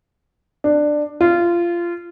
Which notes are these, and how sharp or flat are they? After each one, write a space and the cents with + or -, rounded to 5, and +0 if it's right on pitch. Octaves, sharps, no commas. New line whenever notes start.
D4 +15
F4 -20